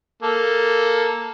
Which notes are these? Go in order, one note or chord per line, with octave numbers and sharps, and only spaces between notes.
A#3 A4